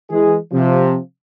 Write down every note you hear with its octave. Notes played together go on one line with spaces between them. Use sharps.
E3 G#3 G#4
C3 F3